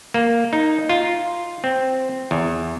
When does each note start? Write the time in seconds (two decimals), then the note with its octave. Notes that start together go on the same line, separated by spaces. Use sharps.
0.14 A#3
0.53 D#4
0.89 F4
1.64 C4
2.31 E2